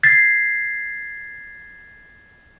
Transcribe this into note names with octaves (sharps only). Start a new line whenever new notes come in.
G#6 A6 B6 C7